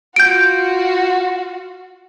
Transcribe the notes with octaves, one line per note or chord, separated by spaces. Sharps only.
F4 F#4 G6 D7